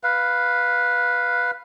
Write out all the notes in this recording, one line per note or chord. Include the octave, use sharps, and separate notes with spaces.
B4 F5